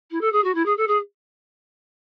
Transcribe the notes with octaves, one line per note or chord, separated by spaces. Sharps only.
E4
A4
G#4
F#4
E4
G#4
A4
G#4